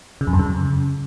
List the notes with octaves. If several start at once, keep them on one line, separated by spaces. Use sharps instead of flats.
C#3
F2
F#2
C#3